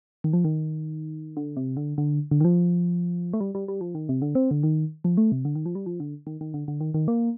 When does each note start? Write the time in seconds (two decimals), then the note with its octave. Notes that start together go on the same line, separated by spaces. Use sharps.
0.24 D#3
0.33 F3
0.44 D#3
1.37 D3
1.57 C3
1.77 D3
1.98 D3
2.31 D3
2.41 D#3
2.44 F3
3.33 A3
3.40 G3
3.55 G3
3.68 G3
3.81 F3
3.95 D#3
4.09 C3
4.22 D3
4.35 C4
4.51 D3
4.63 D#3
5.04 F3
5.17 A3
5.32 C3
5.45 D3
5.56 D#3
5.66 F3
5.75 G3
5.86 F3
6.00 D3
6.27 D#3
6.41 D#3
6.54 D3
6.68 D3
6.81 D#3
6.94 D#3
7.08 A#3